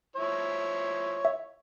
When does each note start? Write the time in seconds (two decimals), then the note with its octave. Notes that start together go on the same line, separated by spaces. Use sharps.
0.16 F3 E4 C#5
1.25 E5